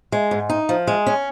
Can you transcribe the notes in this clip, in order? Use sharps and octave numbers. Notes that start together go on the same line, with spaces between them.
G#3
G#2
D#4
F3
G#3
C#4